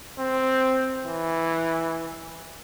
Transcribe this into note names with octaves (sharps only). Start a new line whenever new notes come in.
C4
E3